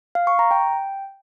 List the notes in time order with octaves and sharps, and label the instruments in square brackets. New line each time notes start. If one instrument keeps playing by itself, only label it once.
[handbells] F5
C#6
A#5
G5